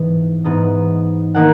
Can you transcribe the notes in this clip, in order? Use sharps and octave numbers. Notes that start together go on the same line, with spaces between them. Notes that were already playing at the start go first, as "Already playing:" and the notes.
Already playing: G#2 E3 B3
G#2 E3 B3 D#4
D#3 A#3 D#4 F#5